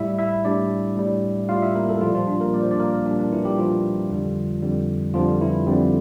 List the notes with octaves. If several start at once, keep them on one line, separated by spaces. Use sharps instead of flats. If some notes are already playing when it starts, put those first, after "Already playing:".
Already playing: A2 G3 E4 E5
E4 E5
A2 G3 D4 D5
A2 G3
A2 G3 F4 F5
E4 E5
A#3 A#4
A3 A4
A#2 F3 G3 F4
F3 F4
D4
A#3 A#4
A#2 G3 D5
C5
D4 D5
A#3 A#4
A#2 G3 D4
D4
E3 E4
G3 G4
A#2 F3 G3 F4
F2 D3 G3
F2 D3 G3
F2 D3 F3 G3 F4
E3 E4
F2 D3 G3 C4